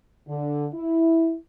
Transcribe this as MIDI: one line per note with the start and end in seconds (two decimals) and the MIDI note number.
0.28 0.66 50
0.74 1.34 64